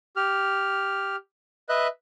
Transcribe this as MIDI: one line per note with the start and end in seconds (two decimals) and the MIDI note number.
0.16 1.16 67
0.16 1.16 89
1.69 1.87 71
1.69 1.87 75
1.69 1.87 76
1.69 1.87 90